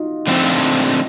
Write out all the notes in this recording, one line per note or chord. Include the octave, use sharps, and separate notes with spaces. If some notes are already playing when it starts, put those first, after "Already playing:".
Already playing: D#4 F4 F#4
D3 F3 A3 C4